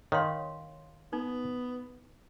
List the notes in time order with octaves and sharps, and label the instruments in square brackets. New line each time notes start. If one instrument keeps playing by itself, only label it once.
[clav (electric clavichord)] D#3 [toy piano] C#5 F5 C6
[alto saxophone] B3 [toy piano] D#4